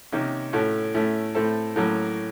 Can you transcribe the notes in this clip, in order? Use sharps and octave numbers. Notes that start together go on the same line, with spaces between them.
C3 D#3 A#3 C#4
A2 A3 C#4 F#4
A2 A3 C#4
A2 A3 C4 A4
A2 F#3 A#3 C#4